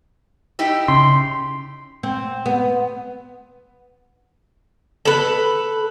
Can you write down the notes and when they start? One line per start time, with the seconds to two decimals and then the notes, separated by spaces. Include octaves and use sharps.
0.59 D#4 E4 G4
0.88 C#3 C6
2.03 C4
2.46 B3
5.05 A4 B4